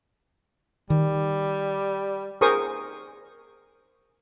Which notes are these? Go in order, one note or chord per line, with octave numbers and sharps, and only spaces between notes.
D#3 G3
G#4 A#4 C5 C#6 D#6